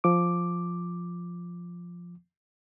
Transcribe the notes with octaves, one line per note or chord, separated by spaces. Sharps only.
F3 D6